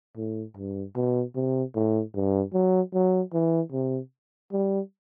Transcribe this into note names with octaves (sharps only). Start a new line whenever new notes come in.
A2
G2
B2
C3
A2
G2
F#3
F#3
E3
C3
G3